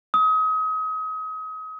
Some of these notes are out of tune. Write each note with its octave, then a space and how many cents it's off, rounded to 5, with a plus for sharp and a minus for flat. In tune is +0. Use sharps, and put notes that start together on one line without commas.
D#6 +35